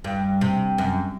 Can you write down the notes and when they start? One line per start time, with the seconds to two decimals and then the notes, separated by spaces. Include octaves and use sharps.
0.04 G2
0.41 C3
0.78 F#2